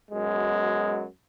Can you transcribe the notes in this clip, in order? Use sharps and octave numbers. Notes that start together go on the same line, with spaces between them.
F#2 B2 G#3